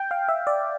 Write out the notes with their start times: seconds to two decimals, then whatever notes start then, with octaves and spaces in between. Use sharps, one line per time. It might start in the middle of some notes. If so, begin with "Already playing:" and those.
Already playing: G5
0.11 F5
0.28 E5
0.47 D5